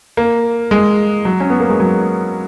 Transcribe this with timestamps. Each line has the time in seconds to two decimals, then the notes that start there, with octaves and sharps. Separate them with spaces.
0.17 A#3
0.71 G#3
1.25 F#3
1.40 C#4
1.50 B3
1.60 A#3
1.70 G#3
1.80 F#3